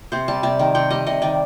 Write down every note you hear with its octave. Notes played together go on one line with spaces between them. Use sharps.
C3 C5
G3 A5
C3 A5
D#3
C3 G5
G3 D#5
C3 D#5
D#3 D5